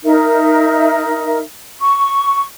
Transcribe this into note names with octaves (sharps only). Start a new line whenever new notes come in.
D#4 A#4 E5
C#6